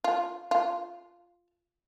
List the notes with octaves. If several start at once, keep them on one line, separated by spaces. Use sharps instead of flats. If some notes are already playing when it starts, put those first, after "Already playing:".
F4
F4